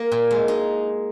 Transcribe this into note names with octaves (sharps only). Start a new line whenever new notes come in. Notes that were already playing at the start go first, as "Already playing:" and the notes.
Already playing: A#3 A#4
A#2
G#3
D#4